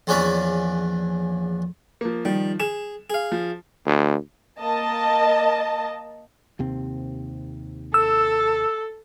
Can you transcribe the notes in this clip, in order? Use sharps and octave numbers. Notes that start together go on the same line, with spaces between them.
A#1 E2 C#4 D4 C#5 B5
F3 A#3
D#3 F3 G3
G#4 E7
G#4 F5
F3
D2
A#3 D#5 A5
D#2 C3 C4
A4 E6